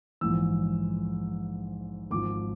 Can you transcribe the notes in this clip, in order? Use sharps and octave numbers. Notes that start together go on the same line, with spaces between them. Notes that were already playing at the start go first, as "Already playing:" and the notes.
A#1 G#2 E3 E6
G#1 G#2 F3 D6